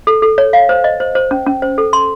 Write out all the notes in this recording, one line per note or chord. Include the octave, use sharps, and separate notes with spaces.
A4
A4
C#5
F5
C5
D#5
C5
C5
C#4
C#4
C5
A4
C6